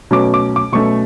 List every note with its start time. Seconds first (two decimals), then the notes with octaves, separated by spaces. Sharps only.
0.11 B2 F#3 A3 C#4 D6
0.34 D6
0.56 D6
0.72 B2 F#3 A3 C#4 C#6